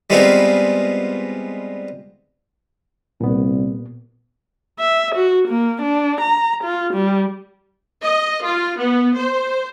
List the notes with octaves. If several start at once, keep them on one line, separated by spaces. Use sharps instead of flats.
G3 G#3 B3 C4 D#4 F4
C2 A#2 B3
E5
F#4
A#3
D4
A#5
F4
G3
D#5
F4
B3
C5